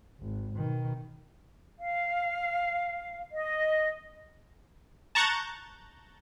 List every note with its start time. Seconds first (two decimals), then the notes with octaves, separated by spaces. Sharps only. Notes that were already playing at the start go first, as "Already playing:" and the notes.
0.20 G#1
0.55 B2 D#3
1.78 F5
3.31 D#5
5.15 A5 A#5 C#6 F#6 G6 A6